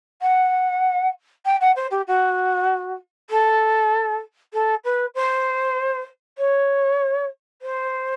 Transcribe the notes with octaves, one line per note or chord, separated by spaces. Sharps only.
F#5
G5
F#5
C5
G4
F#4
A4
A4
B4
C5
C#5
C5